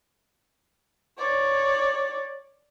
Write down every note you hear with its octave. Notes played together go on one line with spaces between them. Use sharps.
C#5 D5